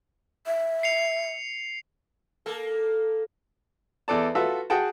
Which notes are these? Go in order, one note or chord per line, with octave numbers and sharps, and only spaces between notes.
E5
C7 C#7 F7
A#3 A4
E2 A4 D5 A5
F4 F#4 A4 B4 E5
F#4 G#4 F#5 G5 A5